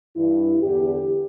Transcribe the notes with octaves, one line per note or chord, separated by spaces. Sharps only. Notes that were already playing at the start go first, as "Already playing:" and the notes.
G2 E3 E4
E2 D3 G4